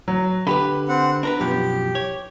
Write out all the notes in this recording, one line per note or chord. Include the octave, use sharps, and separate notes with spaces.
F#3
D3 G4 B4 B5
C4 F#5
D4 A#4 B4 A#5
F#2 B2 F3 G4
C#5